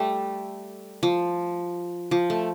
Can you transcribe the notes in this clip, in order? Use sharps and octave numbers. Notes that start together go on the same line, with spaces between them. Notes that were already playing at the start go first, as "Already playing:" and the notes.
Already playing: G3 A3
F3
F3
A3